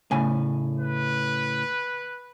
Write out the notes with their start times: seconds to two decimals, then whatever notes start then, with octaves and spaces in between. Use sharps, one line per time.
0.11 A2 C#3 G#5
0.79 B4